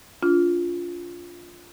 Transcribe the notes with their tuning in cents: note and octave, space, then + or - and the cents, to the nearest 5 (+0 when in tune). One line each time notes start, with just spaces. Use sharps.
D4 -40 F4 +0